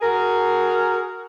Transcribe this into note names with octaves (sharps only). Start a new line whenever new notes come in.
F#4 G#4 A#4